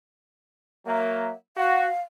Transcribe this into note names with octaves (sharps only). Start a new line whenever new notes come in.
F#3 A#3 E5
F#4 F5